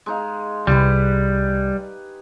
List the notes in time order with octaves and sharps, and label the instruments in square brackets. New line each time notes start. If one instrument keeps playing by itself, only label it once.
[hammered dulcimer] G#3 D#4 F5
[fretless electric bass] C2 [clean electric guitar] G3 [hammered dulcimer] G4 G#4 B4